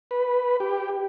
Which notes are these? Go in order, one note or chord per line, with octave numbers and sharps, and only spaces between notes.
B4
G4